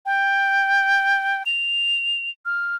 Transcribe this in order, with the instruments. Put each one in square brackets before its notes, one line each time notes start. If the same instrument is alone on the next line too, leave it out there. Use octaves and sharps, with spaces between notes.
[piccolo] G5
F7
F6